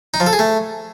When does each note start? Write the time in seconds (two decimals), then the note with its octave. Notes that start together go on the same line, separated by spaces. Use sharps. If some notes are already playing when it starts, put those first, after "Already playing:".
0.14 D#4
0.20 F3
0.26 A4
0.33 G#4
0.39 A3